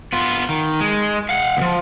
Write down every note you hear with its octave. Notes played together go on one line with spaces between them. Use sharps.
B3 F4
D#3
G#3
F5 F#5
D2 F3